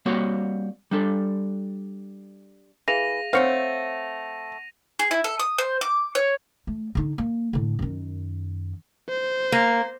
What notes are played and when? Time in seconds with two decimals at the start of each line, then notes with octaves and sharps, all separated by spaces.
0.06 G3 A#3 C4 F#4 C#5 F#5
0.91 G3 D4 A4
2.88 E3 G#4 F5 A#6 D#7 F7
3.33 A3 C4 C#5 F5 F#5 A#6
4.99 G#4
5.11 E4
5.24 A4
5.39 D#6
5.58 C5
5.81 D6
6.15 C#5
6.67 A3
6.95 D3 D#4
7.18 A#3
7.53 A2 D3
7.79 F#2 D#3
9.09 C5
9.52 A#3